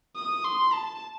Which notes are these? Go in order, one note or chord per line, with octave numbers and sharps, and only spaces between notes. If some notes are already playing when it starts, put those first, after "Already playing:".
D#6
C6
A5